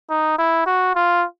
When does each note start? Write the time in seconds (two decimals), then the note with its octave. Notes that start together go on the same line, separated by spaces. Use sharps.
0.10 D#4
0.39 E4
0.66 F#4
0.96 F4